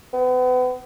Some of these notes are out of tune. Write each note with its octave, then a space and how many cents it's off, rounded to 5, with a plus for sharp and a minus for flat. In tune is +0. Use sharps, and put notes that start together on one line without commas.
B3 +35